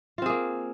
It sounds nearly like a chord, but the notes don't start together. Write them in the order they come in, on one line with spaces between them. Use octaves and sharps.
F4 C4 G#4 A#3